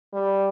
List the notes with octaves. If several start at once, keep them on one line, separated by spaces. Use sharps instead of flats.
G3